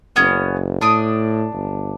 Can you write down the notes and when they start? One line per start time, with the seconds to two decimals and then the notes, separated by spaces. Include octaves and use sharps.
0.16 F#1 B3 C#4
0.81 A2 D4 D#6
1.53 G1